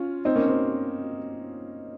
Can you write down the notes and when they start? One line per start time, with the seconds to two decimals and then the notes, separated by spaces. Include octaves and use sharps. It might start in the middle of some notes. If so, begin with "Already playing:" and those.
Already playing: C#4 F4
0.25 C4 D#4
0.36 A#3 C#4
0.48 C4